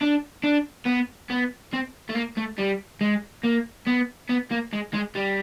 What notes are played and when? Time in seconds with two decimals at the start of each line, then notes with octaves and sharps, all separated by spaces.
0.02 D4
0.43 D4
0.86 B3
1.30 B3
1.73 C4
2.09 A3
2.15 A#3
2.37 A3
2.58 G3
3.01 G#3
3.44 A#3
3.87 B3
4.30 B3
4.51 A#3
4.73 G#3
4.94 G#3
5.15 G3